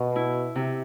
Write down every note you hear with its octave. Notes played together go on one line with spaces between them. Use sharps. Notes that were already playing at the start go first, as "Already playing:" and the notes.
Already playing: B2
E4
C3